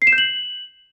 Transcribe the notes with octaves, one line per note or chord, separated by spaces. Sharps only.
C7
E7
G6
F#7